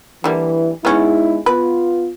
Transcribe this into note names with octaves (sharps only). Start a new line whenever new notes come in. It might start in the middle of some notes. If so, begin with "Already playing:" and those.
D3 E3 G3 A#3
G#3 B3 C#4 D#4 E4
B3 F4 B4